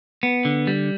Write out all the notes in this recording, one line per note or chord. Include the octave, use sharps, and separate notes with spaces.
B3
D3
G3